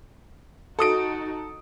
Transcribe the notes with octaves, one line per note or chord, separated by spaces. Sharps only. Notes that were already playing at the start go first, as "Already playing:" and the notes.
D#4 F#4 A4 D#6 D7